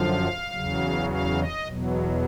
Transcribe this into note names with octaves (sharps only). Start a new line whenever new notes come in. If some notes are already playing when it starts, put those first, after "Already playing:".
Already playing: F#2 D3 F3 F5
E2 C#3 F#3
F5
D#5
E2 B2 F#3